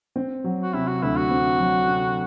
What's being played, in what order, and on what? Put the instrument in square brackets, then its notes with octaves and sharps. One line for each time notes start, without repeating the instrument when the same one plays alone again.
[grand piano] C4
F#3
[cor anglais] F#4
[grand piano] C3 [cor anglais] E4
[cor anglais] F#4
[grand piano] D2 [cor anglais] E4
[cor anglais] F#4
[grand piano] C4
F#3
C3